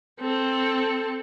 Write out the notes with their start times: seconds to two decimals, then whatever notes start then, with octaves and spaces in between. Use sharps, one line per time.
0.20 C4 A4